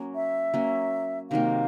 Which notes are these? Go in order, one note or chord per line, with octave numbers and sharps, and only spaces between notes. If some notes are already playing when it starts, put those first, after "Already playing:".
Already playing: F#3 A#3 C#4
E5
F#3 A#3 C#4
C3 D#3 F#3 A#3 F5